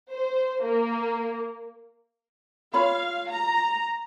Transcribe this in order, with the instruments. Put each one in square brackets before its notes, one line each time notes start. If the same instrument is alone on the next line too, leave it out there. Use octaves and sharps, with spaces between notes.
[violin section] C5
A#3
[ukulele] F4 C#5 B5 [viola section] F5
[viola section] A#5